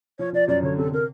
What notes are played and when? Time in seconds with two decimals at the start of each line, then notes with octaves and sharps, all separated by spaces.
0.18 F3 C#5
0.33 F3 D5
0.48 F#2 D5
0.62 D3 C#5
0.77 C3 A4
0.92 C3 A#4